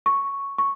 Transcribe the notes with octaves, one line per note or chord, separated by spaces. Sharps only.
C#6
C#6